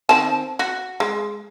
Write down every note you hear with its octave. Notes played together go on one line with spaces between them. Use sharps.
D#3 C4 A5
F#4
G#3